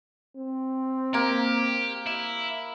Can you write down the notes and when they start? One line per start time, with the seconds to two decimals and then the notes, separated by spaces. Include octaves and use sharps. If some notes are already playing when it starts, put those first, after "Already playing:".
0.36 C4
1.14 A#3 G4
2.06 E4